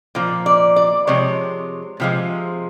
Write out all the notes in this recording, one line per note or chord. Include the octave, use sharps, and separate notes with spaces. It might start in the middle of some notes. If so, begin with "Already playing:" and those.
A#2 F3
D5
D5
C3 F3 G#3 C#5
C3 F3 G#3